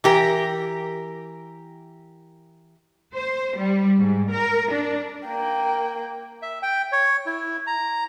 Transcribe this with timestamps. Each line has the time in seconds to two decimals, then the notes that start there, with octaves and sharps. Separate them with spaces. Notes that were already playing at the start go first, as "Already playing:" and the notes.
0.04 E3 G4 A#4
3.14 C5
3.57 G3
3.99 G#2
4.31 A#4
4.71 D4
5.27 A#3 G5
6.42 E5
6.62 G5
6.92 C#5
7.26 E4
7.67 A#5